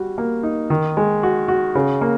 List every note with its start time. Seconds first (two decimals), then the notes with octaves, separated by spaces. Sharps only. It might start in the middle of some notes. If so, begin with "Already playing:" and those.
Already playing: G3 F#4
0.18 A#3
0.43 D#4
0.70 D#3
0.97 G#3
1.23 F#4
1.48 F#4
1.75 C#3
2.01 A#3